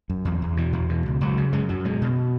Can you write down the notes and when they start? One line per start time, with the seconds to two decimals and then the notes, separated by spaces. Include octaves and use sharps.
0.10 F#2
0.25 E2
0.42 E2
0.57 B2 E3
0.73 E2
0.89 B2
1.06 C#2
1.21 C#2 F#3
1.38 C#3
1.53 F#2 G#3
1.69 F#2 F#3
1.85 B2 G#3
2.02 B2